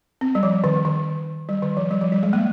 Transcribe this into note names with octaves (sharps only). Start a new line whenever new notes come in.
C4
G3
F3
D#3
D#3
G3
D#3
F3
G3
F3
G3
G#3
A#3